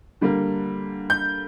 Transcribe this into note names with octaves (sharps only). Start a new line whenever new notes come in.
D3 G3 A#3
G6